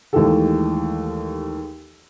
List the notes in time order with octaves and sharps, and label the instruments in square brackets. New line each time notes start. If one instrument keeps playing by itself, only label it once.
[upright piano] D#2 E3 G#3 A3 G4 A4